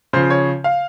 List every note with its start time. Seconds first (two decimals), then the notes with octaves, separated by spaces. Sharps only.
0.13 C#3 F3 C5
0.30 C#5
0.64 F5